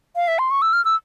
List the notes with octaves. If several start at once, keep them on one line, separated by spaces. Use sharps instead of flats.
F5
E5
C6
C#6
E6
F6
E6